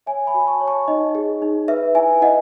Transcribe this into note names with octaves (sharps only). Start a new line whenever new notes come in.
C#5 E5 G#5
G#5 B5
F#4
A5 C#6
C#5
A5 C#6
D#4 D#5
G#4
D#4
B4 E5
E4 E5 G#5
E4 D#5 F#5